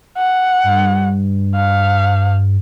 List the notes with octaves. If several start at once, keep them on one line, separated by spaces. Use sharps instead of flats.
F#5
G2
F5